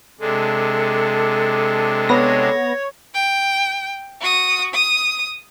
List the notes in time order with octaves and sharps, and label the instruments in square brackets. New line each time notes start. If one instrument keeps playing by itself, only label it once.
[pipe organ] C3 G#3 D4 [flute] A4
[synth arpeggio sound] B3 A#6 [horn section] C#5
[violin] G5
F#4 D#6
D#6